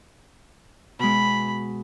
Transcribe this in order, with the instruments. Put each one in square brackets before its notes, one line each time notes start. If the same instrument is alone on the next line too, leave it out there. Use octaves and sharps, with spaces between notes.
[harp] B2 G#3 [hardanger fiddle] B5